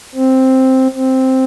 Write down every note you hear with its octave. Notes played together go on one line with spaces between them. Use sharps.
C4
C4